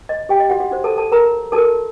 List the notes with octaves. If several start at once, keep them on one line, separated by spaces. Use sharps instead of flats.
D#5
G4 G5
D#5
F#4 F#5
F#4 F#5
D#4 F#4 C5
A4 A5
A4 A5
A#4 A#5
D#4 F#4 A4 A#4 A5